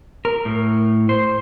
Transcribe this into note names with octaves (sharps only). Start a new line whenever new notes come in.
A#4
A2
C5